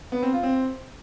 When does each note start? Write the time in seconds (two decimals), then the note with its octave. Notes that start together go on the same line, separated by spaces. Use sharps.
0.12 B3
0.22 C4
0.33 F4
0.43 C4